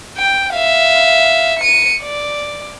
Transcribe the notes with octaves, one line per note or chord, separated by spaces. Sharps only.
G5
E5 F5
C#7 D#7
D5